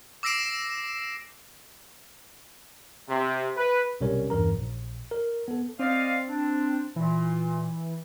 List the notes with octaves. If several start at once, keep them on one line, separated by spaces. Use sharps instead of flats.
D6 E6 A#6 C7 D7 E7
C3
B4
B1 C3 G3 C#4 A#4 C#5
E2 G2 E3 A#4 A#5
A#1
A#4
B3 A4
C4 D5 D#5 F5
D4
A#2 E3